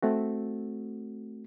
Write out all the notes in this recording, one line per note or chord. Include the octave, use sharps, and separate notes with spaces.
A3 C4 F#4